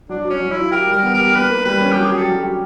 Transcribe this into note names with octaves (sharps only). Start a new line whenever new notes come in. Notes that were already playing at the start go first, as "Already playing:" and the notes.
F#3 D4
F#3
C#4
F#3
E4
F4
G4 A#4
G3
A#4
B3
G4 A#4
A#3 B4
A#3
G3 B4
C#4
F#3 G4
G#4
G4
A4
F#3
G4